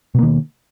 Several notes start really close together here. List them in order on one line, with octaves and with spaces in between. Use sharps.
B2 A#3 D#3